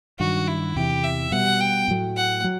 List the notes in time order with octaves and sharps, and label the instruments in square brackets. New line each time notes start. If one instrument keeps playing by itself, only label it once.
[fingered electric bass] G2 D#3 F#3 [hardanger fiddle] F#4
[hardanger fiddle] E4
[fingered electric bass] E2 C3 E3 [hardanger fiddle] G4
[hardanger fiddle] E5
[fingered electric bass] B2 G3 B3 [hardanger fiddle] F#5
[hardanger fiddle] G5
[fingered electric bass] A2 F#3 A3
[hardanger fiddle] F#5
[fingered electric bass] F#3